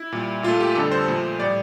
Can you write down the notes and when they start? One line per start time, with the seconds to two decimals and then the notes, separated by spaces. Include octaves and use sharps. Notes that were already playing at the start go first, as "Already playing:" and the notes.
Already playing: E4
0.12 A#2 G3
0.43 A#2 A3 F4
0.60 G4
0.75 F2 D3 G3 A4
0.91 C5
1.08 A#2 F3 A3
1.40 A2 G3 D5